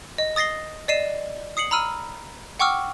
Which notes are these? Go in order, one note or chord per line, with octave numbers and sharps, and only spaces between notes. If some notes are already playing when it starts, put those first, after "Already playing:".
D#5
D#6 A6 A#6 C7 G7
D5 D#5 C7 D#7 E7
D#6 C7 C#7 F#7
A#5 B5 E6 F6 D#7
F#5 G5 C#6 D6 E6 F6